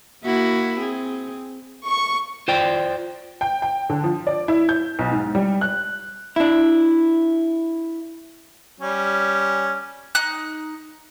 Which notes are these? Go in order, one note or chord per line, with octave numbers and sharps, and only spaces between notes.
A#3 E4 F#4
C4 G#4
C#6
F4 C5 D5 G5
G5
G5
D3
F3
D5
E4
G6
B1
G#2
G3
F#6
D4 E4
G3 C#4
D#4 F#6